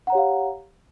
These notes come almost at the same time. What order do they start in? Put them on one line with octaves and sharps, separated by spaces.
F#5 A#5 C#5 G4 F5